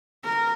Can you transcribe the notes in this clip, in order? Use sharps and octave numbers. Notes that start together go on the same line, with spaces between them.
A#4